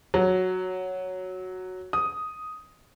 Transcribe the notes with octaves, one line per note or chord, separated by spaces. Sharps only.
F#3
D#6